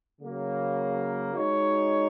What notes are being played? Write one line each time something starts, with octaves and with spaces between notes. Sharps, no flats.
C#3 F#3 A#3
G#3 D#4 F#4 C#5